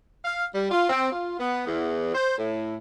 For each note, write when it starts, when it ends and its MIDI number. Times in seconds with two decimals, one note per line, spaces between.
0.25 0.46 77
0.55 0.68 55
0.71 0.87 65
0.89 1.08 60
1.12 1.37 65
1.40 1.64 59
1.67 2.13 40
2.15 2.35 72
2.38 2.75 45